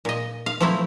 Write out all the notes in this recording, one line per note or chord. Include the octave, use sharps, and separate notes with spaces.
A#2 D#5
F5
F3 F#3 A3 C4 E4